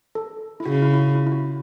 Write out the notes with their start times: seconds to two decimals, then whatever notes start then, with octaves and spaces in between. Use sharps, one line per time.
0.15 A4
0.60 E4
0.65 C#3 F#4
0.82 E4
0.94 E4
0.98 F#4
1.15 E4
1.27 E4
1.32 F#4